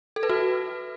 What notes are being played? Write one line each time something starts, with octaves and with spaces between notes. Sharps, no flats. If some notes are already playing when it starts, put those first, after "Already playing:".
A4
B4
F#4